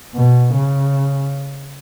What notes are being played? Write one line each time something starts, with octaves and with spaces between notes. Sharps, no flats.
B2
C#3